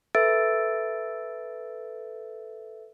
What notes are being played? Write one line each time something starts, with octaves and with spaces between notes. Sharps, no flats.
A4 B4 E5 E6 A6 D7